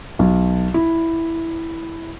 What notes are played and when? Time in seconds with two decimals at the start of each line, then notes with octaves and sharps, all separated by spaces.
0.19 B1
0.74 E4